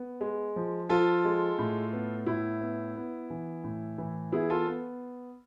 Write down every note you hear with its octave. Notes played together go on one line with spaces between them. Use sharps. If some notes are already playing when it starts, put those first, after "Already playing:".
Already playing: B3
G#3
F3
F3 F4 A4
G#3
A2
B3
A2 E4
B3
B3
E3
A2
E3
B3 E4 G#4
F4 A4
B3